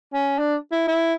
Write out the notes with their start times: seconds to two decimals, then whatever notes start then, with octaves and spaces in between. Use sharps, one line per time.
0.14 C#4
0.38 D4
0.72 E4
0.88 E4